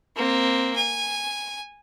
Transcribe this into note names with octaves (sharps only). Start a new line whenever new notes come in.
A#3 C4
G#5